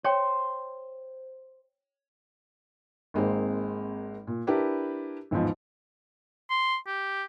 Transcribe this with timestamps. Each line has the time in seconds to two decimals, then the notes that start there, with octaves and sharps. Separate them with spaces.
0.04 C5 C#5 G5
3.14 G#1 G#3 A#3 C4
4.27 A#2
4.47 D4 E4 G4 A#4 B4
5.31 A1 E2 G#2 F3
6.50 C6
6.87 G4